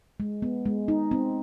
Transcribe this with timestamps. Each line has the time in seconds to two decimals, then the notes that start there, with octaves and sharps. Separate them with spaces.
0.20 G#3
0.42 B3
0.66 G#3
0.88 D#4
1.11 C4